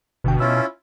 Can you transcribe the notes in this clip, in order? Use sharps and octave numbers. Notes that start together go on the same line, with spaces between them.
G1 B2 D3 G5
C#4 E4 F4 E6